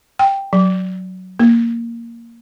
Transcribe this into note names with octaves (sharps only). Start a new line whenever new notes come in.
G5
F#3
A#3